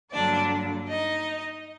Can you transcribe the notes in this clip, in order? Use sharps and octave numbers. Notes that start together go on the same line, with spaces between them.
G2 D3 F#3 A#3 D4 D5
D#4 D#5